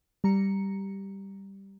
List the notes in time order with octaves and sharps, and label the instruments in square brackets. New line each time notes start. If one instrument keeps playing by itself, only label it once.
[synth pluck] G3 A#5 C#7